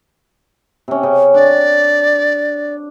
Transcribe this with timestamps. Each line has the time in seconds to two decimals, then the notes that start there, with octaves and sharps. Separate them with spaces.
0.88 C3 C#4
1.03 C#3
1.34 D4 D5